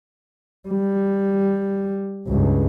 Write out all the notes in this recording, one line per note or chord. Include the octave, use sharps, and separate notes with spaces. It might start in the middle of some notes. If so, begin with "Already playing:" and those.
G3
C#2 G2